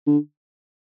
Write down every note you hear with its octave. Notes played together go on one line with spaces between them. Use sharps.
D3